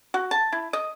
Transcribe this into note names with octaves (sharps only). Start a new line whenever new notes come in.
F#4
A5
E4
D#5